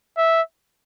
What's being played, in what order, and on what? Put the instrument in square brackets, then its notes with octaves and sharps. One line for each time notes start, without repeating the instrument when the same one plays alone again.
[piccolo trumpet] E5